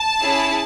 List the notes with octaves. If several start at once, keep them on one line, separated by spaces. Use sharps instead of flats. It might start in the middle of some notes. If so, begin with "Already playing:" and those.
Already playing: A5
C#4 E4 G#4